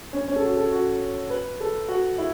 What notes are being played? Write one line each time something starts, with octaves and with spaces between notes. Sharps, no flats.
C#4
C#4
A4
F#4
A4
F#4
B4
A4
F#4
E4